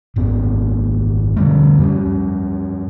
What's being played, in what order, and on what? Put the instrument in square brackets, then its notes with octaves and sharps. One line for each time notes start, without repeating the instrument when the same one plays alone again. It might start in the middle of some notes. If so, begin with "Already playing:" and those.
[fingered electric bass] G#1 F#2 B3
D3 G3 A3
F#2 G3 B3 C#4